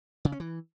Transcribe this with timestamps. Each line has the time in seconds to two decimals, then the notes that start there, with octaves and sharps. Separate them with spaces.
0.25 C#3
0.32 C#4
0.40 E3